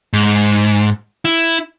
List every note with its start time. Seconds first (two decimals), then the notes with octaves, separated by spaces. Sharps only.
0.13 G#2
1.25 E4